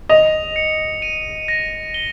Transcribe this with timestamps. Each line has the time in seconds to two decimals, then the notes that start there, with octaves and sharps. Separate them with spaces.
0.09 D#5 F7
0.56 C#7
1.02 D#7
1.48 A#6
1.94 G7